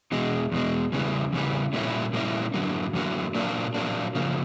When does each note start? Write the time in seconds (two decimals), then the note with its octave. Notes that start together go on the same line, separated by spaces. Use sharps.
0.12 E2 B2 G#3
0.52 E2 B2 G#3
0.92 E2 C#3 E3 G3
1.32 E2 C#3 E3 G3
1.73 A#2 G3 A#3 C#4 E4
2.13 A#2 G3 A#3 C#4 E4
2.54 F#2 D3 F#3 A#3
2.93 F#2 D3 F#3 A#3
3.35 A#2 F#3 A#3 D4
3.74 A#2 F#3 A#3 D4
4.15 C#3 F3 A#3